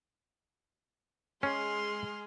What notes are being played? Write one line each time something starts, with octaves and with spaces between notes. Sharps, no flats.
G#3 C#4 G#4 C6 F6